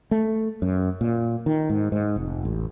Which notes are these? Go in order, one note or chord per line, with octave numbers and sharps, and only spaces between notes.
A3
F#2
A#2
D#3
G#2
G#2
F1
A1